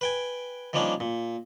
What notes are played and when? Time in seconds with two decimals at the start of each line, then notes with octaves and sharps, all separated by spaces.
0.01 B4 G5 G#5
0.73 D#3 F3 G3 A#3 C#4 D4
1.00 A#2